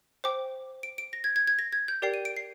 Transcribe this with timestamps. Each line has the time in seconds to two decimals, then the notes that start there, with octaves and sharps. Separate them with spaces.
0.24 C5 G5 D6
0.83 D7
0.98 D7
1.13 A#6
1.24 G#6
1.36 G#6
1.47 G#6
1.59 A#6
1.72 G#6
1.88 G6
2.02 G4 A#4 D5 G5 C7
2.14 D#7
2.25 D7
2.37 C7